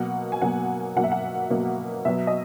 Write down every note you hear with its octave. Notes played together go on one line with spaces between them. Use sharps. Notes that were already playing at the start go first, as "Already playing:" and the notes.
Already playing: B2 F#3 A#3 F#5
G#5
B2 F#3 A#3 F#5
B2 F#3 A#3 F#5
E5
F#5
B2 F#3 A#3
B2 F#3 B3 E5
D#5